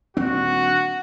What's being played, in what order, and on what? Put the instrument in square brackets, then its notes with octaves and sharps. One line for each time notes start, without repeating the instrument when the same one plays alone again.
[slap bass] D#1 C4 D4 [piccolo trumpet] F#4